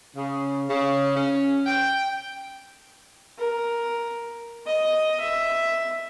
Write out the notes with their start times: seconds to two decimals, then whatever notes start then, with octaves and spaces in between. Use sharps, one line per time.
0.16 C#3
0.69 C#3
1.15 C#4
1.66 G5
3.39 A#4
4.67 D#5
5.21 E5